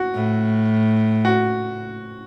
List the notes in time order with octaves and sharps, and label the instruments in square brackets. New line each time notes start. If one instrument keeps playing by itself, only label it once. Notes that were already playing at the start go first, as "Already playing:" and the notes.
Already playing: [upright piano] F#4
[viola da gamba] A2
[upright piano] F#4